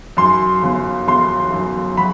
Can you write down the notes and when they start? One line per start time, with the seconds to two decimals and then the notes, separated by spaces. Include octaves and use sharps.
0.17 F#2 C6
0.63 G1
1.08 G1 C6
1.52 F#2
1.97 F#3 B5